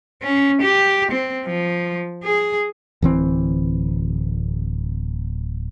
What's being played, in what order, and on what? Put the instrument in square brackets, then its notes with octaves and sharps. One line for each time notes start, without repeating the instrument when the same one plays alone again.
[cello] C#4
G4
C4
F3
G#4
[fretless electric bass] D1 E3 C4